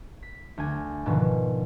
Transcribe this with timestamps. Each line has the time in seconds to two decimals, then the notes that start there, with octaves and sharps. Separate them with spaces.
0.22 B6
0.57 D2 G#5
1.06 G#2 B2 D3 D#3 F3